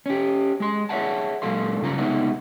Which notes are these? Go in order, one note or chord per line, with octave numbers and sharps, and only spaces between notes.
C#4 G4
G#3 C6
G#4 C#5 D5 E5 F#5 A5
A#2 F#3 G#3 A4 F5 C6
G2 C#3 F4 A#5
C3 G#3 B3 D#4 E5 F#5